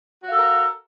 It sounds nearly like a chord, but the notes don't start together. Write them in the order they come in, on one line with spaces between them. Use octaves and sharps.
F#4 F5 A4 A#4